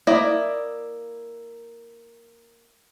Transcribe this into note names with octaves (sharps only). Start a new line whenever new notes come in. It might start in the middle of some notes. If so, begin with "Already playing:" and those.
A#3 E4 D5 D#5